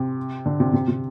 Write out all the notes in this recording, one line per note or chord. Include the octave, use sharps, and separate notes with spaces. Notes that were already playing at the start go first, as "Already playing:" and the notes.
Already playing: C3
D3
C3
C3
C3